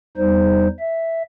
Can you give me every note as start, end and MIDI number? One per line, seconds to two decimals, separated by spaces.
0.17 0.68 40
0.17 0.68 55
0.17 0.68 63
0.17 0.68 72
0.79 1.22 76